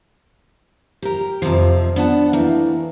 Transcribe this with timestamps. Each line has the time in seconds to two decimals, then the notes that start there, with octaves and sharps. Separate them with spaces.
1.02 G4 A#4
1.42 F2 C3 F3
1.96 B3 D4 F#5 A5
2.33 E3 A3 A#3